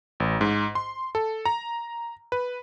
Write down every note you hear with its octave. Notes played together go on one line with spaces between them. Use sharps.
A1
G#2
C6
A4
A#5
B4